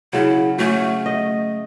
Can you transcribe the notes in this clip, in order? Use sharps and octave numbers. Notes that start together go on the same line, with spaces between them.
C#3 F#3 E4
F#3 A3 C#4
D#5